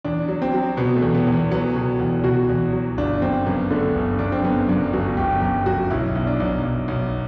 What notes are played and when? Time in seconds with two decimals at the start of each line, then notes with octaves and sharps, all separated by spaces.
0.04 E2 D4
0.28 F#3
0.42 C4
0.54 F#3
0.77 B2 B3
0.96 A3
1.02 E2
1.14 B3
1.27 E2
1.33 B3
1.51 F#3 B3
1.76 B2
2.00 E2
2.24 B2 F#4
2.49 E2
2.73 F#3
2.97 G1 D4
3.22 F#2 C4
3.46 F#2 B3
3.70 D3 A3
3.95 G1
4.19 F#2 D4
4.32 C4
4.44 F#2 B3
4.69 F#2 D4
4.93 G1 F#4
5.17 G1 G4
5.41 F#2 G4
5.66 F#2 F#4
5.90 B1 E4
6.15 B1
6.27 D4
6.40 B1
6.63 B1
6.88 B1